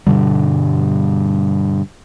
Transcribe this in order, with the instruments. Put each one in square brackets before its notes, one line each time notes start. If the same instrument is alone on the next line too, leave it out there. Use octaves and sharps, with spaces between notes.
[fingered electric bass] G2 B2 D3 G3